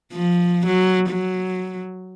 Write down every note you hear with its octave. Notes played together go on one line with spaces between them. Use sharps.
F3
F#3
F#3